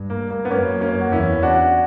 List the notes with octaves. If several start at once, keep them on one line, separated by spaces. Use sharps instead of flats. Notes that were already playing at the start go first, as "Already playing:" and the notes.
Already playing: G2
A#3
A#3
B3
F#2 A#3 C#4
A#3 C#4
F#4
E2 C#4 E4
D4 F#4